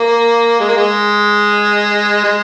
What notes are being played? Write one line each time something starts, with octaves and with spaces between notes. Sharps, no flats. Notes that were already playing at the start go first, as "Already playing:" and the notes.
Already playing: A#3
G#3
A#3
G#3
G#3